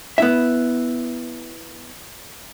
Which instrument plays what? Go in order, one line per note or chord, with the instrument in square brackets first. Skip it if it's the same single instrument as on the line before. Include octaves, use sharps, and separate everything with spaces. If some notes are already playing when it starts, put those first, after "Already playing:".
[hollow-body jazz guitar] B3 E4 E5